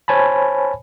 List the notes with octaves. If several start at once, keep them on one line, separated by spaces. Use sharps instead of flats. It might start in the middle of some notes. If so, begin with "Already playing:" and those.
C5 C#5 G#5 A5 B5